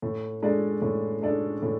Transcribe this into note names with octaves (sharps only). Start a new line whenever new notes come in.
A2
G#3 D4 A4 D5
A2
G#3 D4 A4 D5
A2